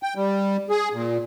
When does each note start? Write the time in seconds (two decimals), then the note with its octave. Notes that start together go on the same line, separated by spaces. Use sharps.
0.03 G5
0.16 G3
0.70 G#4
0.93 A#2